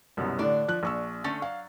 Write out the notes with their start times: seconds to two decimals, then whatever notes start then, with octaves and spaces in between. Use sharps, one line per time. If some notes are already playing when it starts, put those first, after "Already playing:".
0.17 C2 F#2 B2
0.39 A2 D3 D4 D5
0.68 F3 F#6
0.83 A#1 C#6 E6
1.24 D3 A3 C#4 A6
1.42 F#3 F5